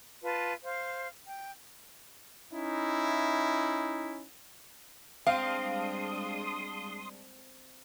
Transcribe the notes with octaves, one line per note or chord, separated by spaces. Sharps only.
F4 B4 A5
C5 F5
G5
C#4 D#4 E4
G3 G#3 C4 D4 F5 C6 D#6